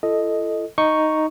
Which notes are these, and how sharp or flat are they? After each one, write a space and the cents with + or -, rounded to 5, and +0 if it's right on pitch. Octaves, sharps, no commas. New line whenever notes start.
E4 +45 A4 +0 D#5 +0
D#4 +0 C#6 +0